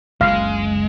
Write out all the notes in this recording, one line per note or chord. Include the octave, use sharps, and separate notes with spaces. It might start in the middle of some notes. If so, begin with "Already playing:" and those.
F#1 C#2 D3 G#3 F5